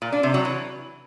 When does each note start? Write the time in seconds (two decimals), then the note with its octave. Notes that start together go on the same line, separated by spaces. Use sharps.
0.02 A#2
0.12 D4
0.23 C3
0.34 F#3
0.45 E3